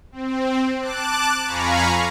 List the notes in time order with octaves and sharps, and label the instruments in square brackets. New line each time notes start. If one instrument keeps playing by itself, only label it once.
[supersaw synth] C4
A5 D6 F#6
F2 F5 G#5 A#5 B5 C#6